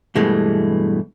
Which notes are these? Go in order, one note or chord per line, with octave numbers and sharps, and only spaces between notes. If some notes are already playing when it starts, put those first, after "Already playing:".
E2 G2 B2 E3 G#3 A3